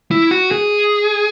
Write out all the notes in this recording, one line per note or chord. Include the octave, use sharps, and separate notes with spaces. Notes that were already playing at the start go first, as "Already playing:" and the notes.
E4
F#4
G#4